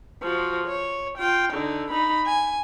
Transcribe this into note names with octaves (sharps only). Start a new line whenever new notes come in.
F3 F#4
C#5
F4 G5
D3 D#4
D#4 B5
G#5